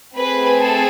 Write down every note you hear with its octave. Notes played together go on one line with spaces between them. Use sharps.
A3 C4 G#4 B4
A4